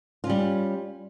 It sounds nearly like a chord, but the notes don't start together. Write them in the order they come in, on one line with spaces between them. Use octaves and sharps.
F4 C#4 G3